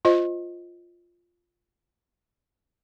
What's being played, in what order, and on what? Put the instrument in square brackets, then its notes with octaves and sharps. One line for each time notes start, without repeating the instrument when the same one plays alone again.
[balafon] F4 C5 D#5